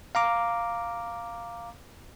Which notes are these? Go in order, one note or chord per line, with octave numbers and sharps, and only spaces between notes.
F5 A#5 D6